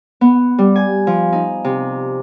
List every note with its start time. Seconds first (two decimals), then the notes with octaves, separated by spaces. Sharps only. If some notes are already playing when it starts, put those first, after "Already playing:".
0.21 B3
0.58 G3
0.76 G#5
1.07 F3
1.33 D#4
1.64 C3